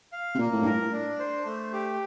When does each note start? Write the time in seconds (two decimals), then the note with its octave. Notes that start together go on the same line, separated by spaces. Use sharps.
0.12 F5
0.35 C3
0.38 A#2 A#3
0.53 A2
0.62 G2
0.66 A2 A#4
0.92 D4
1.19 C5
1.46 A3
1.73 G4